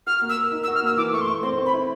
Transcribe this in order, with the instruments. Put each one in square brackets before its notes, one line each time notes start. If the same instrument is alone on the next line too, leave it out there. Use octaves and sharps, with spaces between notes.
[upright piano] F#4 [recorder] F6
[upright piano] A#3
[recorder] E6
[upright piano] A#4
D#4
[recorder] E6
[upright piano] F#4
[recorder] F6
[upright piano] A#3 [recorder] E6
[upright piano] E3 [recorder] D6
[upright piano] A3 [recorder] C#6
[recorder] C6
[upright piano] A3 [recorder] C#6
[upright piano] C4 [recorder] C6
[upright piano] C4
[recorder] B5
[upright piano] E4